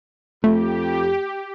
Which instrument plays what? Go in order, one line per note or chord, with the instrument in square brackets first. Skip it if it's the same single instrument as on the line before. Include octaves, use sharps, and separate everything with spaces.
[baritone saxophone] F2 [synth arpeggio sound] A3 [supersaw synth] G4